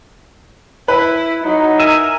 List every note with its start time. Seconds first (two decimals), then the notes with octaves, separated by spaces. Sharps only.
0.88 E4 B4
1.44 F#3 D#4
1.79 A#4 E5 G#5